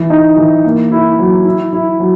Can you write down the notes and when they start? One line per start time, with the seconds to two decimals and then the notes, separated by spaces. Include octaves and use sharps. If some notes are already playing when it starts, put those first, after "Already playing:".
Already playing: E3
0.10 D#4
0.37 E3
0.65 A#3
0.91 E4
1.19 F#3
1.45 E4
1.73 E4
2.00 F#3